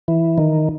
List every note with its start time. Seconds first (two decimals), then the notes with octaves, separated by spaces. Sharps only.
0.08 E3
0.38 D#3